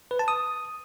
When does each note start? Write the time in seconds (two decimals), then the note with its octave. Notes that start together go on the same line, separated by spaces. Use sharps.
0.11 B4
0.19 A5
0.28 D#6